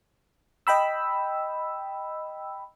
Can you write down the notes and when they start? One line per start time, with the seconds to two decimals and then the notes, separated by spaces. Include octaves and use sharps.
0.67 D#5 G5 B5 E6